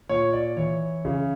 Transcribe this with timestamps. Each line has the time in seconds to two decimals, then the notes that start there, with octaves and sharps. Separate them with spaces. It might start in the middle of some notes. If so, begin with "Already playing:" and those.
0.09 A#2 C#5
0.33 D5
0.57 E3 C#5
1.05 C#3